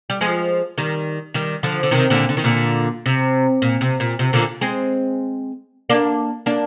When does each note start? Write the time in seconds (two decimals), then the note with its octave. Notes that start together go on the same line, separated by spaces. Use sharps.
0.10 G3
0.21 F3 G#3
0.78 D#3 G3
1.34 D#3 G3
1.63 D3 F3
1.83 D3
1.91 C3 D#3
2.10 A#2 D3
2.29 D3
2.37 D#3
2.44 A#2 D3
3.06 C3
3.62 A#2
3.81 C3
4.00 A#2
4.19 C3
4.33 A#2 D3
4.61 G#3 C4
5.90 A#3 D4
6.46 A#3 D4